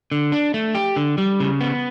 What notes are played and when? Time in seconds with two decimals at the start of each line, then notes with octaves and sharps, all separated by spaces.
0.12 D3
0.32 D4
0.54 A3
0.75 G4
0.96 D3
1.18 G3
1.40 C#3
1.61 B3